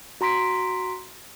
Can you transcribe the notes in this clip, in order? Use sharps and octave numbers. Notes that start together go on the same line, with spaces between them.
F#4 A#5 C6 B6 D7